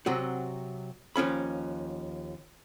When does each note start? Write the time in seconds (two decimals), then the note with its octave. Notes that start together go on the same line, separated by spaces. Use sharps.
0.06 C3 F#3 C4 F#4
1.16 D#2 F3 C#4 B5